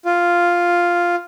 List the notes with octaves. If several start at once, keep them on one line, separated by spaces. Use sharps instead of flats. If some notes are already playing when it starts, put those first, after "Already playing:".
F4